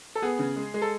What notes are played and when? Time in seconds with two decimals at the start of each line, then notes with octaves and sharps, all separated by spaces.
0.15 A4
0.22 B3 G#4
0.39 C#3
0.56 G#3
0.74 G#3
0.82 A4